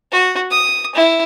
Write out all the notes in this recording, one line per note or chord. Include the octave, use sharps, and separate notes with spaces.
F#4
D#6
E4